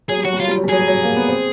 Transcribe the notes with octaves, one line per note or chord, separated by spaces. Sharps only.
F#3 G#4
G3
F#3 F#4
G3
F#3 F4
G3
F#3
G3
F#3 G#4
G3
F#3
A#3
B3
C4